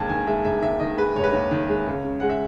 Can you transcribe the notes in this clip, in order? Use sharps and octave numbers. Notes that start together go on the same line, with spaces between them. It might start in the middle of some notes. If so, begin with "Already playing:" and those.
Already playing: E1 D#2 A5 G#6
D#3 G#5
G#3 E5
E1 E5
D#2 E5
D#3 D#5
G#3 B4
E1 C#5
B4
D#2 C#5
D#3
G#3
C#2
C#3
G#3 F#5
E5